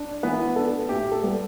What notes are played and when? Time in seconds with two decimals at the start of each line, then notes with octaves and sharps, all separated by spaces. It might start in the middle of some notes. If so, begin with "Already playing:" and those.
Already playing: D4
0.23 E3 B3 B4
0.56 B3 D4 A4
0.89 A2 G4
1.11 A4
1.22 G3 B3